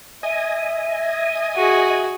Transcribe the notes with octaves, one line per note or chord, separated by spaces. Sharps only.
D#5 E5 G#5
F#4 G#4